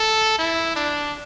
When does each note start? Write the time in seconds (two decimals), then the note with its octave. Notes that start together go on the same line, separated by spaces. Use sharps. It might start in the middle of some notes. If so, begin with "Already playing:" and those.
Already playing: A4
0.39 E4
0.76 D4